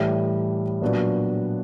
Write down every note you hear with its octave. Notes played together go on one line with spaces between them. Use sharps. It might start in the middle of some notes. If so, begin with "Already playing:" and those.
Already playing: A2 E3 G3
A#2 F#3 B3 D4 F#4